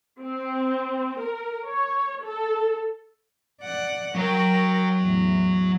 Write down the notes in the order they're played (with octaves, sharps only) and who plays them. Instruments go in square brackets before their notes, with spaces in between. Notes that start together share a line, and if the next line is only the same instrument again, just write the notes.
[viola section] C4
A#4
C#5
A4
[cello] D5 F#5
[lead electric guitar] F#3 C#5 [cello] A#4 G5
[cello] E2 A2